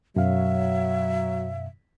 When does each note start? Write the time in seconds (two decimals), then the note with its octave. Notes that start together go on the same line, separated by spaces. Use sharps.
0.16 F#2 B2 F#3 E5 F5